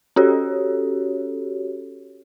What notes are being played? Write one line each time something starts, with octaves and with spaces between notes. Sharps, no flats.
C#4 F#4 G4 A4 C#5